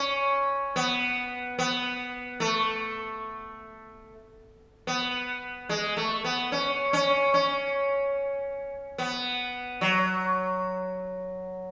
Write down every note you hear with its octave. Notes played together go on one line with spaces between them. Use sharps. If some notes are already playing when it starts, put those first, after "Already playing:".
Already playing: C#4
B3
B3
A3
B3
G#3
A3
B3
C#4
C#4
C#4
B3
F#3